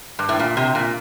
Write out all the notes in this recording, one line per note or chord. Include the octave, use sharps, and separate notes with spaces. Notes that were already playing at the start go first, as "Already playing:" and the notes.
G2
A2
A#2
C3
A#2